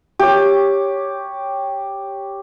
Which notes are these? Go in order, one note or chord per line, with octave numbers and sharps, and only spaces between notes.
G4 C#5